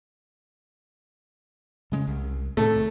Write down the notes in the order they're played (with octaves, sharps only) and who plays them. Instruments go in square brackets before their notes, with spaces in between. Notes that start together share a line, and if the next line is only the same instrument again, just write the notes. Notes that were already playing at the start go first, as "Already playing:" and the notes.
[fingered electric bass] C#3 G#3 C#4
C2
[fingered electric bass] A2 C3 D#3 [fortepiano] A3